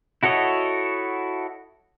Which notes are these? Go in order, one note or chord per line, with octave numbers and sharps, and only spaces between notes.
E4 F#4 A4 C#5 D#5